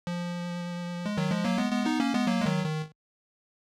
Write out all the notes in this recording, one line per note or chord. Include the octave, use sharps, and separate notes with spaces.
F3
G#3
D#3 F#3
F3 G#3
F#3 A#3
G#3 B3
G#3 B3
B3 D#4
A#3 C#4
G#3 B3
F#3 A#3
G#3
D#3 F#3
D#3